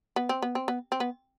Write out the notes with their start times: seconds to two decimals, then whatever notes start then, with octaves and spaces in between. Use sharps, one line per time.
0.16 B3
0.29 C4
0.42 B3
0.55 C4
0.68 B3
0.92 C4
1.00 B3